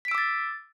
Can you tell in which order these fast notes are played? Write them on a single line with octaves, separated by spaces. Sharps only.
B6 D7 E6 D6 A6